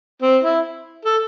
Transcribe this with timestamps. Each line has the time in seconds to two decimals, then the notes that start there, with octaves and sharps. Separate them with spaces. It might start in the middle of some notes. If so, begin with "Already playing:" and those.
0.22 C4
0.43 E4
1.05 A4